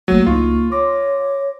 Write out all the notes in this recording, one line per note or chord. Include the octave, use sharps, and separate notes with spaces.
G#1 F#3 A3 A#3 D#7
C#2 D#4 F4 C#6
C#5 C6 D6 A#6